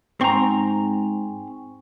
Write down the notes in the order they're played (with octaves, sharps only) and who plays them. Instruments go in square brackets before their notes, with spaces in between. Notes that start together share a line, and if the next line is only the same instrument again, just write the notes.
[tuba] G#2 [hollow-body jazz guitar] C4 [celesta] G5 G#5 C#6 [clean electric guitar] A#5 C6